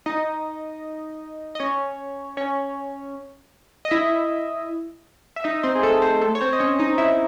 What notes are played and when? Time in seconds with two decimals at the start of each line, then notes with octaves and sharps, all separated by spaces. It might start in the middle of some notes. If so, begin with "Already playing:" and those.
0.06 D#4 D#5
1.55 D#5
1.60 C#4 C#5
2.37 C#4 C#5
3.85 D#5
3.91 E4 E5
5.36 E5
5.44 D#4 D#5
5.63 C4 C5
5.75 G#4
5.83 A3 A4
6.02 C4 C5
6.21 A3 A4
6.35 C#5
6.41 C4 C5
6.53 D#5
6.60 C#4 C#5
6.79 D#4 D#5
6.98 E4 E5